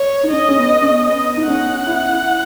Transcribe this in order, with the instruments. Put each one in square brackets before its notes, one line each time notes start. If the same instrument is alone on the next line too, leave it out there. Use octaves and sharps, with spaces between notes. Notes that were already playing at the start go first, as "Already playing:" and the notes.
Already playing: [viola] C#5
[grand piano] D#4
[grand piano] C#4 [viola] D#5
[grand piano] C#4
B3
C#4
[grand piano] B3 [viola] D#5
[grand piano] D#4
[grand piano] C#4 [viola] F#5
[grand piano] E4
E4